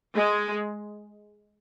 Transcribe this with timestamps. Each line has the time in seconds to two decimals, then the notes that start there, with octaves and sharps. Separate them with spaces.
0.15 G#3